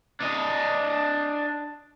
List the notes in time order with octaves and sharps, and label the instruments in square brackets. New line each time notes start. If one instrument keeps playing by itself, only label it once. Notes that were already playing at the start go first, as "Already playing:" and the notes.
[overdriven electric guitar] D4 D#5